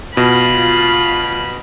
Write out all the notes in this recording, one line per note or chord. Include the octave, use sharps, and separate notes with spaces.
B2 F4 B5